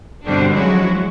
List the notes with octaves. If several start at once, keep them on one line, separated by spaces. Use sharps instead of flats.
G2 B2 D3 G3 C4 D4
F3 F#3 G#3 C#4 E4 F#4